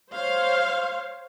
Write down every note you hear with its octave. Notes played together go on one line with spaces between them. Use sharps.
C5 C#5 F5